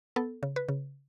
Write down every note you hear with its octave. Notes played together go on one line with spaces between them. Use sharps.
B3 A4
C#3
B4
C#3